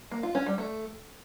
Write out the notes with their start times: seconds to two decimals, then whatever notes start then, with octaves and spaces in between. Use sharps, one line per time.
0.11 A#3
0.23 F4
0.35 C#4
0.46 G3
0.58 A3